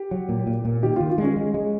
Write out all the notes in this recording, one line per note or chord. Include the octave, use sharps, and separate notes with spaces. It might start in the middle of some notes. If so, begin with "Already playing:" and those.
Already playing: G4
F#3
A#2
A#2
A#2
D#3 G4
D#3 F4
F4
G#3 C#4
G#3
G#3